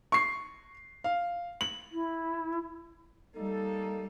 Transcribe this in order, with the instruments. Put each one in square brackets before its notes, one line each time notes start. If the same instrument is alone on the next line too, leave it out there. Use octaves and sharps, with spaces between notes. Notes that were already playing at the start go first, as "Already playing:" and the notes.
[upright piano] C#6 C7
F5
F#7
[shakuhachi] E4
[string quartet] G3 [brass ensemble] A#3 D#4 A4